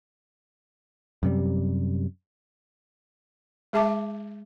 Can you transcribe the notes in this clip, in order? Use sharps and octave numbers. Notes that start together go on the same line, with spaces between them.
F#2 C3 G3
G#3 G#4 E5 A5 D6